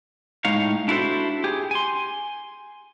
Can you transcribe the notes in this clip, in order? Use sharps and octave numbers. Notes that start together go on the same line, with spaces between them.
A2 G#3 D#4 C#5 F5
D4 E4 F#4 G4 A4 C5
G4 G#4
G#5 C6